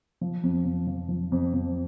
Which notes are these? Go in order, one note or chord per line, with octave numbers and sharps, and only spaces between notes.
F3
F2
F2
F3
F3
F2
F2